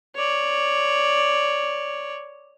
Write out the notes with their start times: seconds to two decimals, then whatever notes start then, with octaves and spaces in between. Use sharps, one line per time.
0.16 C#5 D5